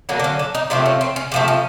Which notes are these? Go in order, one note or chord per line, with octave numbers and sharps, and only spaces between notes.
D3 F#3 A#3
D4
C#4
D4
D#4
C3 F3 A3 C4 D4
C#4
C4
C#4
C3 F3 A3
C#4